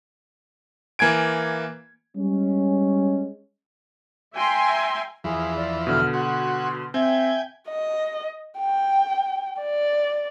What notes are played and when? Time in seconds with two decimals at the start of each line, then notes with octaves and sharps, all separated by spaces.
0.99 E3 A#3 G#5 G#6 D7
2.16 G3 G#3 C#4
4.35 E5 G5 G#5 A#5 C6
5.24 E2 E3 F3 G#4
5.57 D5
5.87 B2 D3 F6
6.13 F#4 C6
6.94 C4 E5 G5 G#5
7.69 D#5
8.59 G5
9.61 D5